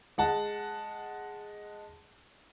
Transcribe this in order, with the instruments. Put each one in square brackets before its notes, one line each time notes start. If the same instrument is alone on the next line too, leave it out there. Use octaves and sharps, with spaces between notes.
[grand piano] G#3 F#5 A5